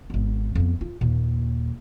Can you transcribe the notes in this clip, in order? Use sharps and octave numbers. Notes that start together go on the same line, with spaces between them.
G#1 B3
F2 B3
F4
D#2 A#2